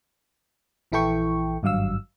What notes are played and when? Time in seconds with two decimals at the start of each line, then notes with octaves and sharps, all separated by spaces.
0.92 A#1 E3 E4 A4 G5 C#6
1.63 G#1 G2 F#3 F5 E6